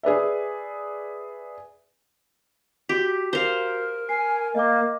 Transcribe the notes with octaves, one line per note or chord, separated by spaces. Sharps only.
G#4 B4 D5 E5
F#4 G4 B6
A#4 C5 F5
G#5 C7
A#3 D#5 D6